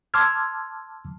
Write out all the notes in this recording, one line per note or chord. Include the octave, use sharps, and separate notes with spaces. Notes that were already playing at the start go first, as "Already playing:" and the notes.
A5 C6 D6 E6 F6 G#6